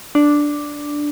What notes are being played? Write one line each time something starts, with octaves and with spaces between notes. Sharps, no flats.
D4